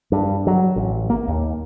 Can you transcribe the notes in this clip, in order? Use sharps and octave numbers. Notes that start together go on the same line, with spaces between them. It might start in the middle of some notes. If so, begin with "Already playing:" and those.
G2
F#3
A1
A#3
D#2